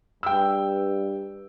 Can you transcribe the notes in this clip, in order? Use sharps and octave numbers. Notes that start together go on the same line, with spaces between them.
G2 G5 E6